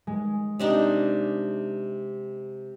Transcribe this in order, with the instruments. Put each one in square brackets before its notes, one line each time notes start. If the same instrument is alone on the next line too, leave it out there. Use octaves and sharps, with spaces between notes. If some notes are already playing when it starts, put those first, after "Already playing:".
[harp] G#3
[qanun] C3 D4 D#4